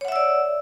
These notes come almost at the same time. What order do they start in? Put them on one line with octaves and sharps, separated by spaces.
C#5 F#5 E5 E6 D5